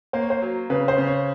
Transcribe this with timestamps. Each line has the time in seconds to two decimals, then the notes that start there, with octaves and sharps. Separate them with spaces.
0.13 A#3 C5
0.22 C#5
0.30 C5
0.42 F#3
0.70 C#3 B4
0.88 C5
0.98 C#3
1.07 C#5